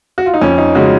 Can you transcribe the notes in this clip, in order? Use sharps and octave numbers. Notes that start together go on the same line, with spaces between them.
F#4
F4
D#4
F2 C#4
D#4
C#3 G#3 F#4